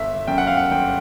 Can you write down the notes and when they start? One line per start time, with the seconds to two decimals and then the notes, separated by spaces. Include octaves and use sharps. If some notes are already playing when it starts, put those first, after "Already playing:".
Already playing: G1 E5
0.27 F#2 G5
0.38 F#5
0.47 F5
0.57 F#5
0.71 G1 G5